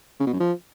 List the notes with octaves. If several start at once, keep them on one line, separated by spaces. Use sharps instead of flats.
C#3
B2
F#2
F3